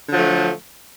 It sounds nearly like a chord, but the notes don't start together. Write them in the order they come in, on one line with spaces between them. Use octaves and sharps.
D3 F#3 F3 A3